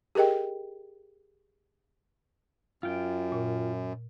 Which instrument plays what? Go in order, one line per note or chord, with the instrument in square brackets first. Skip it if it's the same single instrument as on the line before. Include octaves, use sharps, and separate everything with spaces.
[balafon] G4 G#4 A#4 D#5 G5
[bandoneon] F#2 [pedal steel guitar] F4 G5
[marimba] A#2